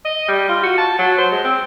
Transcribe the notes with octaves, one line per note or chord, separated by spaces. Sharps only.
D#5
G3
F4
F#4
A5
F#3
C5
G#3
C4